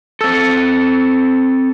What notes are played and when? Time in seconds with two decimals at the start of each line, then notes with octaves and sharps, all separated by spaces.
0.21 C4 A4 E6 A6 C#7